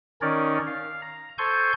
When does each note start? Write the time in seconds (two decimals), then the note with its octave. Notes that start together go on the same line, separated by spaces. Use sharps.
0.22 D#3 C#4 D#4 A#4 C#5 D5
0.67 F5
1.02 A#5
1.38 A4 C5 G#5 C6 C#6 G6